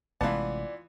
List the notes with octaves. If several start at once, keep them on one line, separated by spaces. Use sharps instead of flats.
A1 C3 E3 G#3 B3 F4 D5 A5